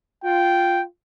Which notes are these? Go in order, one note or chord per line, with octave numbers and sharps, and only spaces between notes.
F4 G5